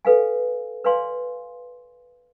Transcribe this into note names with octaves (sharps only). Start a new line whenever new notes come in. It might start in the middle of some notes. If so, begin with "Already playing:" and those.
A4 B4 F5 G#5
B4 C#5 D5 F5 G#5 C6